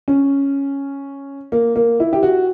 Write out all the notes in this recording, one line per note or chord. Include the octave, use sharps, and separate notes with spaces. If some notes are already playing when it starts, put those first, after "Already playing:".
C#4
A#3
A#3
E4
G4
F#4